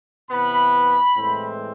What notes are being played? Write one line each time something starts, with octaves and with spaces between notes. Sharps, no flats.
C3 E3 B3 B5
A2 E3 G#3 C4